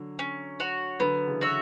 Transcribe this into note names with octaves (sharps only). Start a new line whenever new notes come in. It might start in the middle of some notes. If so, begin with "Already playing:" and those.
Already playing: D3 F#3
C#4
F#4 C#5
D3 F#3 B3
C#3 E3
F#4 C#5 E5